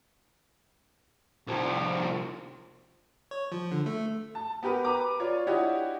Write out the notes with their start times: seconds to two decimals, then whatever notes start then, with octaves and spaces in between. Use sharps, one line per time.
1.47 C2 F3
3.31 C#5
3.52 F3
3.72 D3
3.86 A3
4.35 A5
4.63 B3 G4 A#4 B4
4.84 B4 A#5 D6
5.20 F4 C#5 D5
5.47 D4 E4 F#4 G4 C#5 D#5